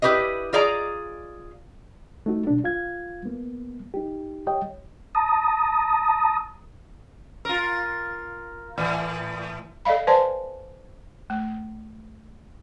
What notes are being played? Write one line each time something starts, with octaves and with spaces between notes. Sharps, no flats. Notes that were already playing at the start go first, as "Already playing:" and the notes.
E4 G4 B4 D5 D#5
F4 G#4 D5 D#5 A#5
A3 D#4 F#4
B2 D4
F4 F5 G#6
A#3 B3
D#4 G4
G4 C#5 D#5 G5
A5 A#5 D#6
F4 A#4
A2 E3
A4 D5 D#5 F5 B5
B4 C5 D5 G#5 A5 C6
A3